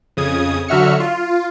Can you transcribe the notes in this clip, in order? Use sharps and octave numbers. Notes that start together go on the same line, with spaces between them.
F2 C#3 D#6 G#6
D3 F#3 F#4 E5 F6 C#7
F4